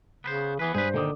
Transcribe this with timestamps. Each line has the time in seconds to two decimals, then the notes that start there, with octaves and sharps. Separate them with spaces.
0.24 C#3 B3 B4 C5
0.59 E3 B3 G#4 B4
0.74 G2 G#4 B4 C5
0.94 A#2 D3 D#3 D6 D#6